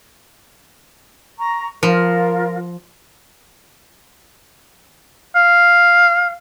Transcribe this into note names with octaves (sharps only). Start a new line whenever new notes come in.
A#5 C#6
F3 F4 A#4
F5